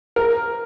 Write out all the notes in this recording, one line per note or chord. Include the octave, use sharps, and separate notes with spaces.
A#4